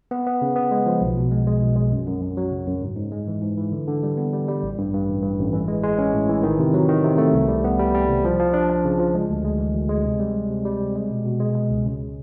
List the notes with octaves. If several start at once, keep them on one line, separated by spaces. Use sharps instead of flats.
B3
B3
C#3
B3
G#3
F3
B1
B2
G#3
G#3
B1
G#3
F#2
F#2
F#2
F#3
C#3
F#2
G#2
G#2
G#3
E3
G#2
E3
D3
D3
G3
B3
G3
G3
A1
G2
G2
A1
G2
A1
E3
G#3
G#3
C#4
A2
E3
D#3
C3
F#3
D#3
C3
A3
C2
G3
B3
G3
G3
C2
F3
F3
D4
D4
C#3
F3
G#3
D2
G#3
E3
D2
G#3
C3
G3
G3
C3
G3
C3
G#3
B2
B2
G#3
G#3
C#2
C#3